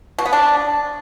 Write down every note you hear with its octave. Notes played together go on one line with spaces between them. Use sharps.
B2
B3
D4